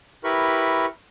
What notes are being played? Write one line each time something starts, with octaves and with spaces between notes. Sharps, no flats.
E4 G4 A#4 B4 B5 C#6